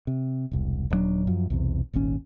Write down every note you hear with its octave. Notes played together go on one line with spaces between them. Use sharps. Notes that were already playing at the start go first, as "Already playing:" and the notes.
C3
E1 C2
D#1 G2 F#3 D4
F#2 F3
B1 E2 C3
D#1 G#1 D#2 C#4